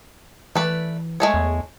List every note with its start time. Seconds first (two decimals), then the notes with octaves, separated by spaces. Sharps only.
0.55 E3 A3 B4 D5
1.20 G#3 A3 C#5
1.34 E2